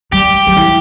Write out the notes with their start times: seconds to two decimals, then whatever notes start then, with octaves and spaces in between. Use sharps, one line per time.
0.12 G3 G4
0.47 F#3
0.57 E3